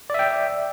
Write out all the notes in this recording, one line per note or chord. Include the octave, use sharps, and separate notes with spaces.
D5 E5 G5